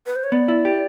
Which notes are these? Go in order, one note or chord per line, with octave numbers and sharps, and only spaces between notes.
B4
C5
C#5
B3 D5
E4
G4